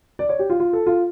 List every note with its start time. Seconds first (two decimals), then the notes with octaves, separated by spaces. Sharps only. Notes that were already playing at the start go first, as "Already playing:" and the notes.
0.19 D5
0.29 C#5
0.39 G4
0.50 F4
0.60 F4
0.73 A4
0.86 F4